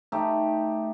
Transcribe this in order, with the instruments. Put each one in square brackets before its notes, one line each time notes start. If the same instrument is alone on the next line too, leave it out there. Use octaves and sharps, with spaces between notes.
[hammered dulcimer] A3 D#4 G4